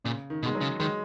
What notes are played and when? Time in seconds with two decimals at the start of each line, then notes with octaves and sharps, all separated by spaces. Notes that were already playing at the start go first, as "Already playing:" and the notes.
0.05 A#2 C#3
0.30 D#3
0.43 B2
0.46 G#3
0.55 F#3
0.61 C#3
0.80 D#3 G#3